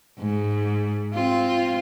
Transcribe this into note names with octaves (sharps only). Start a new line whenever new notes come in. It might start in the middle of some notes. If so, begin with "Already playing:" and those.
G#2
C4 F4